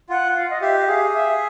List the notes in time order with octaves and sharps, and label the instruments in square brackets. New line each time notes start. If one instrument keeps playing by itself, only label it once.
[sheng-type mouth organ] F4 [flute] F#5
[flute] F5
D#5
[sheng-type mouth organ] G4 [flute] E5
[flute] E5
[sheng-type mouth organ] G#4 [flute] F5
[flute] E5